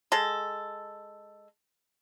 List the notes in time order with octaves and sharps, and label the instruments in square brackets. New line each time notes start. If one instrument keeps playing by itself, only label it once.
[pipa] G#3 A4